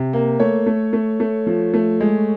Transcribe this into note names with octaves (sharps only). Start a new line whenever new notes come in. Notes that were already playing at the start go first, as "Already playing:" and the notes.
Already playing: C3
A#3
A3 C#5
A3
A3
A3
F3
A3
G#3